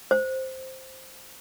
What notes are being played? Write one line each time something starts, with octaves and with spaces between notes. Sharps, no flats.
C5